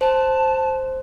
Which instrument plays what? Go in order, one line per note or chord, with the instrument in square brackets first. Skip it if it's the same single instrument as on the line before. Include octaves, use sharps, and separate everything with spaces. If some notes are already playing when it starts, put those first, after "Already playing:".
[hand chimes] C5 [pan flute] A5